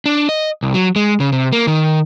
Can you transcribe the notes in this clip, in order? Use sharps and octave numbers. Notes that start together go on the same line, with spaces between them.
D4
D#5
C2
F#3
G#3
C#3
C3
A#3
D#3